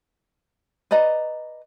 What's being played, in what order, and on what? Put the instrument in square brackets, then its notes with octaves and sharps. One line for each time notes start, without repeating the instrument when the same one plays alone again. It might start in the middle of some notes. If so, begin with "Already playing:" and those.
[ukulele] B4 D5 D#5 A#5